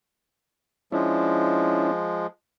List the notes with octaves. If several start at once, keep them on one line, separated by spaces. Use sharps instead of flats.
F3 G#3 C#4 D4 E4